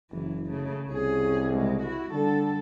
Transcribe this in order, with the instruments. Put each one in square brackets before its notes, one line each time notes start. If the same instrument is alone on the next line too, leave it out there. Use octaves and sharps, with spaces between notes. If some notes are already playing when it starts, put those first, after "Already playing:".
[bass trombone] F#1 [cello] E3 F#3
[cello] C#3 A3
[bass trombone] C2 [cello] C#4 G#4
[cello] C#3 G#3
E4 F#4
[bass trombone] D3 [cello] G3 A4